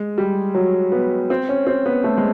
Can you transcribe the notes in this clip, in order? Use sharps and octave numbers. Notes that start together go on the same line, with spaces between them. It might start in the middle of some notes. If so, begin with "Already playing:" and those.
Already playing: G#3
G3
F#3
B3
C4
C#4
C4
B3
A3
G#3